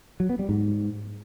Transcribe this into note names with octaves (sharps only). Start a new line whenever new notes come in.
F#3
B3
G3
G#2